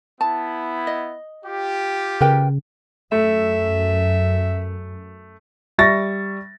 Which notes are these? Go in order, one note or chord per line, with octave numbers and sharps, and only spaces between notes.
B3 E4 A5
D#5
F4 G4
C#3 A#4 B4 G5
F#2 A3 E5
G3 E5 C#6 A6 A#6